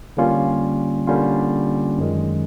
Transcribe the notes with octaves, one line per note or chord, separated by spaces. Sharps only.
D3 G3 A#3 C#4 F4
D3 G3 A#3 C#4 F4
F#2 D#3 G#3